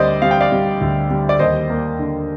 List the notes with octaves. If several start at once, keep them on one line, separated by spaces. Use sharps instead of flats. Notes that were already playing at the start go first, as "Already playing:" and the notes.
Already playing: D2 G3 C5 D5 D#5
G3 F5
G5
D5 F5
G3
D2
G3
D5
D#2 C5 D#5
A#3
D3